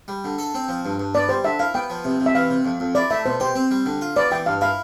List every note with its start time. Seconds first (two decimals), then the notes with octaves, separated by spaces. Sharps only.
0.08 G3
0.24 D3
0.39 A4
0.54 C4
0.68 F3
0.85 G2
1.00 G2
1.14 B3 D5
1.29 G3 C5
1.45 D3 E5
1.59 E4 F5
1.74 B3 G5
1.90 F3
2.04 C3
2.20 C3
2.26 E5
2.35 E3 F5
2.50 C3
2.65 F2
2.80 F2
2.95 E4 D5
3.10 A3 E5
3.26 B2 C5
3.40 G4 C5
3.55 C4
3.71 G3
3.86 D3
4.01 F4
4.16 B3 D5
4.31 E3 G5
4.46 G2 F5
4.61 E4 F5